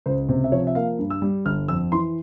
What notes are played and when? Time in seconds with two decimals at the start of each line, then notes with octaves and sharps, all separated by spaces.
0.06 C#2 C5
0.29 C3
0.44 E5
0.52 F3 C#5
0.67 E5
0.75 A#3 F5
0.99 G2
1.10 E6
1.22 G3
1.46 G1 F6
1.68 F2 E6
1.92 E3 C6